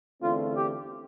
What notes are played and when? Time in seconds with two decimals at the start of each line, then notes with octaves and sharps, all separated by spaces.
0.22 E2 D3 A3 C4 F4
0.55 G4